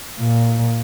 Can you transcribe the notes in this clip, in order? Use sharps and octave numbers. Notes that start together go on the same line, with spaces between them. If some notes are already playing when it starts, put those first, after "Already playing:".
A#2